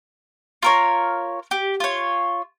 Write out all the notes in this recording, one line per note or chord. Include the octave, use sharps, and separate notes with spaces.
F4 A#4 C#5
G4
F4 C#5